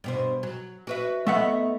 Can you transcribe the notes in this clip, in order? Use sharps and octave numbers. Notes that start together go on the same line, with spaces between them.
G2 B2 C5
F#3
F#4 B4 E5
A3 B3 D#4 E5 F#5